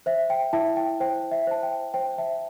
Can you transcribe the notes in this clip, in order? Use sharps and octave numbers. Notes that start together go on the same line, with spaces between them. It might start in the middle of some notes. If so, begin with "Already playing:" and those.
C5 E5
G5
E4 E5 A5
G5
C5 G5
E5
C5 A5
G5
C5 G5
E5 A5